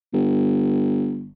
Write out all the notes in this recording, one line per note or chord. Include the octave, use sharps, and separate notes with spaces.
G1